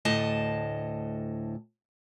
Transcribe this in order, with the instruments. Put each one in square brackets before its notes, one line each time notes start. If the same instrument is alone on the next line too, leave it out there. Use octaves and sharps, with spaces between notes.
[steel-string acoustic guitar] D2 A2 D#5 A5